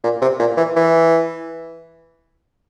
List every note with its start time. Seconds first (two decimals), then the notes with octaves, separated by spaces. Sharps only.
0.03 A#2
0.22 C3
0.40 A#2
0.57 E3
0.76 E3